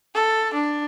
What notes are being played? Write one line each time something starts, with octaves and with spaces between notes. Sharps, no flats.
A4
D4